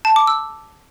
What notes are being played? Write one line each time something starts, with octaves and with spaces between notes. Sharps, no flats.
A5
D6
E6